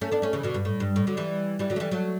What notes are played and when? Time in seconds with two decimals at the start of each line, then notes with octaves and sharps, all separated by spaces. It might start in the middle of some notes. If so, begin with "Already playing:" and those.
0.01 A3 C#4
0.12 B3 D4
0.22 A3 C#4
0.33 C#3 E3
0.43 B2 D3
0.54 G2
0.65 A2
0.80 G2
0.96 A2
1.07 D3 F#3
1.17 E3 G3
1.59 E3 G3
1.70 D3 F#3
1.76 A3
1.80 E3 G3
1.91 F#3 A3